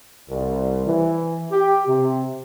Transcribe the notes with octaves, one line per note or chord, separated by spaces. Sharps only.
C2
E3
G4
C3